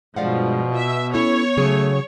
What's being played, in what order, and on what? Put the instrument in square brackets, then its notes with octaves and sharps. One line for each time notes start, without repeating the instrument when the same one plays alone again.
[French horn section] G2 G#3 [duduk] B2 [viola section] F3 [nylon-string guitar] D5 F5 F#5
[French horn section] B3 [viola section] E5
[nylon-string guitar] C#4 E4 A4 [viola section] C#5
[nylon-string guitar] C#3 F#3 G#4 [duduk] A3